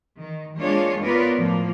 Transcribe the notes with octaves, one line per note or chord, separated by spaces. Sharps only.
D#3
G#3 A#3 D4 F4 C#5
B3 F4 A#4 B4 C#5 D5
A2 F3 A#3 F4